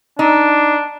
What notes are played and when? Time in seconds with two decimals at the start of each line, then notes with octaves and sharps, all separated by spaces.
0.19 D4 D#4